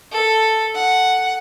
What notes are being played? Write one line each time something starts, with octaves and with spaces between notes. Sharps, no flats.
A4
F#5